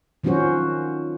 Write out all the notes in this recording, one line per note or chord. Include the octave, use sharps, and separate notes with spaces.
D#3 F3 F#3 C#4 F#4 C5